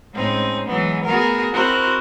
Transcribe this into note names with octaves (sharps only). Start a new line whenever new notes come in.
A2 G#3 C4 C#4 D#4
E3 F#3 G#3 B3
A3 B3 F#4 G#4 A#4
C4 E4 F#4 A#4 C5